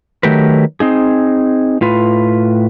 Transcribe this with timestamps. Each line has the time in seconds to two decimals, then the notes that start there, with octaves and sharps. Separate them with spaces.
0.23 D#3 F#3 A3 G4 A#4 B4
0.80 C4 D#4 G#4
1.81 A2 F4 B4